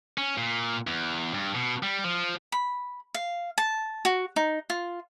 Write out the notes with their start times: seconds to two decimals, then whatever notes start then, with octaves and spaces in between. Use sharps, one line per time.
0.18 C#4
0.38 A#2
0.87 E2
1.34 G2
1.55 B2
1.83 G3
2.04 F3
2.52 B5
3.15 F5
3.58 A5
4.05 F#4
4.36 D#4
4.70 F4